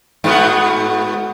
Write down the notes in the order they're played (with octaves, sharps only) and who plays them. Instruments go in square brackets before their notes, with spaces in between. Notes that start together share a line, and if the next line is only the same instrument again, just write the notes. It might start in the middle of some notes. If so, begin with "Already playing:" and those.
[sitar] G#2 B3 F#4